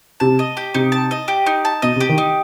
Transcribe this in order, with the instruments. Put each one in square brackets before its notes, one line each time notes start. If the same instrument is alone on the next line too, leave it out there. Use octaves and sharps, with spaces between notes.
[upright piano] C3 [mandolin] A5
[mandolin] D#5
G4
[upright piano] C3 [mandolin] D#4
[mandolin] A5
D#5
G4
D#4
A5
[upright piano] B2 [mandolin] D#5
[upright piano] C3
[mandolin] G4
[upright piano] D#3
[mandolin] D#4